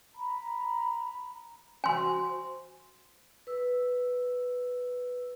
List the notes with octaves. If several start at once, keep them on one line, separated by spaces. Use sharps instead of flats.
A#5 B5
F#4 C5 G#5 C6
B4 E6